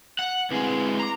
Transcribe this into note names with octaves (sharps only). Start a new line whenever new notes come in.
F#5
D2 G#3 C4 E4 B4
A#5 D6 C7